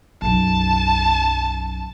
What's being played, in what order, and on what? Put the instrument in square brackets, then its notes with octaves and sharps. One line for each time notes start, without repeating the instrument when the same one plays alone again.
[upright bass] B1 F#2 [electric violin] A5